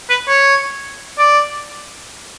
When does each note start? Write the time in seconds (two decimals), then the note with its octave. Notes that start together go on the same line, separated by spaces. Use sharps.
0.10 B4
0.28 C#5
1.19 D5